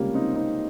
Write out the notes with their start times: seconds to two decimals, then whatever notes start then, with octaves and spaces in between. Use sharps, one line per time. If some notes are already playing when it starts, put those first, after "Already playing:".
Already playing: C#2 C3 G3 A#3 C#4
0.14 C4 D#4
0.36 C4 D#4